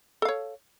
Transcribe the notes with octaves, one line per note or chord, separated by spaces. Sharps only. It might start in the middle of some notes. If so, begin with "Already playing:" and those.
A4 C#5 F5